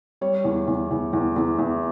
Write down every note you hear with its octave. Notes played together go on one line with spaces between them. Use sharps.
G3 C#5
E2
E2
E2
E2
E2
E2